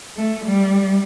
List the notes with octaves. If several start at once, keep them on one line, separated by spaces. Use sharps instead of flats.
A3
G3